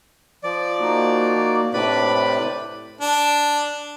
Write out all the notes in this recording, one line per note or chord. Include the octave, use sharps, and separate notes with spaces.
F3 D5
A#3 D#4 F#4
A2 C3 D4 B4 D5 B5
C5
D4